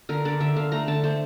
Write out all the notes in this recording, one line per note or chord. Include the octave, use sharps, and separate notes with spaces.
D3 A#4
D3 D5
D3 E5
D3 F5
A3 A#5
D3 A5
A3 C5